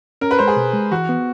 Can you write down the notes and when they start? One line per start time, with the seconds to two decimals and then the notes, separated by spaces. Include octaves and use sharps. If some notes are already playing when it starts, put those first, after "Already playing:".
0.21 C#4 A#4
0.31 B4
0.39 G#3 C5
0.47 G#4
0.56 B2
0.73 G#3
0.92 E3 F#4
1.09 B3